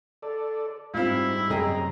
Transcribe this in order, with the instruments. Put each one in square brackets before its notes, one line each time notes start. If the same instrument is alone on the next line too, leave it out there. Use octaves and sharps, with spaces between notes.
[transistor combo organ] A4 D5
[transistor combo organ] G#2 G3 [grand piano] C4 F4 [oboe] E4
[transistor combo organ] F#2 C3 A#5 [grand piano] G#4 D#5 G5